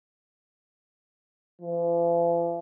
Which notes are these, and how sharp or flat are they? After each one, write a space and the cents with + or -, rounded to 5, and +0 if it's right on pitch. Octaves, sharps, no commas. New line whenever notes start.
F3 -45